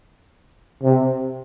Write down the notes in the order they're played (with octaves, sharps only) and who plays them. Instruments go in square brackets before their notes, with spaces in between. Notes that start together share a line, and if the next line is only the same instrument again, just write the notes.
[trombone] C3